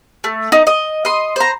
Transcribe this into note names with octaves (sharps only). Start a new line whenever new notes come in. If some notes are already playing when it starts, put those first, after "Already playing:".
A3
D#4
D#5
D#5 C6
C5 A#5